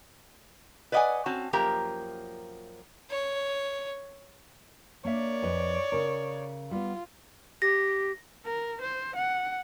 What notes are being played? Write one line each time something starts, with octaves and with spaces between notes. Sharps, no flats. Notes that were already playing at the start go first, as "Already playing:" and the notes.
B4 D5 D#5 F5 F#5 G#5
C4 C#4 F#4 A5
F#2 F3 A#3 G4 A#4 A#5
C#5
A#3 D4 C#5 D5 E5
F2 B4 D#5
C#3 A#4
G3 B3 F4
G4 A#6
A#4
C5
F#5